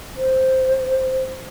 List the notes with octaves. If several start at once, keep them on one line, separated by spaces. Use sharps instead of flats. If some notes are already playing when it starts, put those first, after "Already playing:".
C5